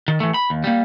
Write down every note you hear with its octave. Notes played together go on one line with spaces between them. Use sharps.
D#3
E3 A3
B5
D#2
G3 A#3